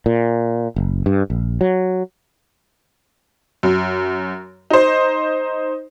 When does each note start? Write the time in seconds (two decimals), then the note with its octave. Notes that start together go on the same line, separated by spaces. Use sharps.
0.06 A#2
0.76 F#1
1.06 G2
1.30 A#1
1.61 F#3
3.63 F#2
4.71 D#4 C5